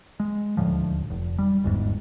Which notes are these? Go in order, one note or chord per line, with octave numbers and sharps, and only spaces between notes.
G#3
D#1 D2 A2 F3
F1
G3
G1 E2 G#2